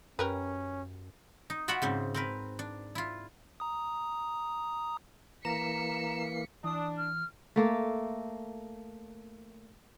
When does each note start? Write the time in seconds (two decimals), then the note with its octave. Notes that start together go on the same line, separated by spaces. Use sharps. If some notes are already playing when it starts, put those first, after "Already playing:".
0.19 F#2 C#4 G4 A#4 B4
1.50 D#4
1.68 F4 F#4 D5 E5 F#5 B5
1.82 G#2 C#3 C4
2.14 C4 A#4 B4
2.59 D4
2.95 E4 F4
3.60 A#5 D#6
5.45 E3 A#3 A#5 B6 C#7 E7
6.64 E3 D4 D#6
6.97 F6
7.56 A3 A#3 A4